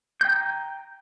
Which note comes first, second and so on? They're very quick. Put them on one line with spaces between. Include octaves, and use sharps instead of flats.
G6 G5 A#5